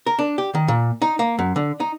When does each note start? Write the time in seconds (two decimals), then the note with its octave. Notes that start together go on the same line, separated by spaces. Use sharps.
0.06 A#4
0.19 D4
0.38 G4
0.55 D#3
0.68 A#2
1.02 D#4
1.19 A#3
1.39 F#2
1.56 D3
1.80 D#4